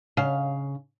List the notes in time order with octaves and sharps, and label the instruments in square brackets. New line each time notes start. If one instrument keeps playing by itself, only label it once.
[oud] C#3 F5